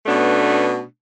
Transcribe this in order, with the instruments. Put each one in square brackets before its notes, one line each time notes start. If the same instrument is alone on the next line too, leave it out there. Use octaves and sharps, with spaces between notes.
[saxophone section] B2 A3 B3 C#4 D4